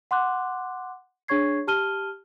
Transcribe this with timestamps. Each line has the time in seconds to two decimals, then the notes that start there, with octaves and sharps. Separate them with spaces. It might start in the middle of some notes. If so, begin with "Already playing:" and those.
0.11 F#5 C6 D6 F#6
1.28 D4 G#4 C#5 C#6 G#6 C7
1.67 G4 A5 F6 D#7 G7